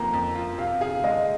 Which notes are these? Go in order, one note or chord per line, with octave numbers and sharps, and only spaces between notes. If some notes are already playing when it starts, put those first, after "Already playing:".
Already playing: F2 F3 A#3 A#5
F2
F4
C3 F5
G#4 F5
G#3 D#5